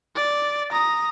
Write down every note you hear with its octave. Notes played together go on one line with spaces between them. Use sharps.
D5
A#5 D#6